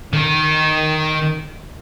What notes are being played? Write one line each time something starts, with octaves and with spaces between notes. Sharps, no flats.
D#3 A#4